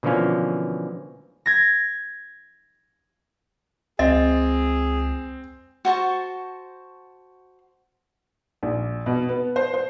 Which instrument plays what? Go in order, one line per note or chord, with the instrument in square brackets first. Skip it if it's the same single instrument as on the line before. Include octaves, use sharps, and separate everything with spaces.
[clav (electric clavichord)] B2 D3 E3 F3 A#3 C#4
[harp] G#6 A#6
[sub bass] C#2 [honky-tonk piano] C4 [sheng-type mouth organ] G#4 [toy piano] D#5
[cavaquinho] F#4 C5 A5 C#6
[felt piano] A#1
B2
B3
C5
C5